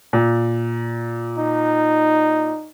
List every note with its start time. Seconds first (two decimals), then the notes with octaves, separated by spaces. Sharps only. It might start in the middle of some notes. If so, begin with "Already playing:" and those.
0.13 A#2
1.38 D#4